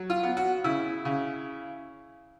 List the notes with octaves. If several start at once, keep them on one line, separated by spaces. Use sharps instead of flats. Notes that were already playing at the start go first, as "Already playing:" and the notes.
Already playing: F#3
F4
B3
F#4
C#3 E4
C#3